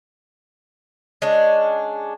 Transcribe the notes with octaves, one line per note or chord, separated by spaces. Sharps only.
G#3 C#4 D4